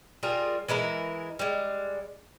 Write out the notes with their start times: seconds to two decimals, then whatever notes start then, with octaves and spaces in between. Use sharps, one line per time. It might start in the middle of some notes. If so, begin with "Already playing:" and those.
0.23 G3 F4 G#4 A#4
0.68 E3 G#3 E4 A#4
1.39 G3 G#3